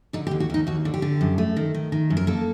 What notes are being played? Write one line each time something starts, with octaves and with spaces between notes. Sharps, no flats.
D3 D#4
G4
D#2
F#4
D#2 D#4
D#2 F#4
D3
G4
D3
F#2
A3
D#3
D#3
D#3
F#2
A#4
A#3 A4